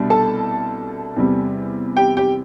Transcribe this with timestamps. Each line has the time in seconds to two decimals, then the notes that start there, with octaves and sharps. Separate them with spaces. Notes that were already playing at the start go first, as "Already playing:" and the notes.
Already playing: C2 B2 G3 D4
0.10 A4 A5
1.16 E2 C3 G3
1.97 G4 G5
2.17 G4 G5